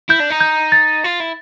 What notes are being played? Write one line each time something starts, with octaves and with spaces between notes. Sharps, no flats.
E4 G6
D4
D#4
G6
A6
F4
E4